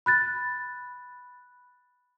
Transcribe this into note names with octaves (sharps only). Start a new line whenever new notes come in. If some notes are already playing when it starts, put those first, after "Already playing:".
B5 F#6 A6